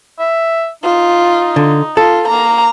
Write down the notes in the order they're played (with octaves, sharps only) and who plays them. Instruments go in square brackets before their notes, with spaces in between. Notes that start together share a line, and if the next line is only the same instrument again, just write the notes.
[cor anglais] E5
[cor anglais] D#4 [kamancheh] F4
[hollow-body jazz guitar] D3
[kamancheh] F4 [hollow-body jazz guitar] A4
[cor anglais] A#3 [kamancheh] A#5